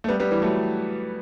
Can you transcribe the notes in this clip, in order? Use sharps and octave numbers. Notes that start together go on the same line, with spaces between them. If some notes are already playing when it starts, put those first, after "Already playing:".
A3
G3 B3
G3 B3
E3 G3
F#3 A3